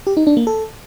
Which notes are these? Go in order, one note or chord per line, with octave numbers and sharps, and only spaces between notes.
G4
D#4
D4
A#3
A4